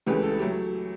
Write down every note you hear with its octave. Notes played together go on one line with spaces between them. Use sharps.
C#2 C#3 E3 A3 G4 B4
A4
F#3 A3 G4